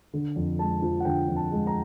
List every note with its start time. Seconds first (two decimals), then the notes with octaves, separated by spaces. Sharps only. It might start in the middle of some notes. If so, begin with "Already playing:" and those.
0.13 D3
0.36 F2
0.59 G#3 A5
0.82 F3
1.00 F#5
1.05 D3 G5
1.28 F2
1.36 A5
1.52 G#3
1.67 A#5